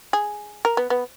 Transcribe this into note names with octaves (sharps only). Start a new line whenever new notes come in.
G#4
A#4
B3
B3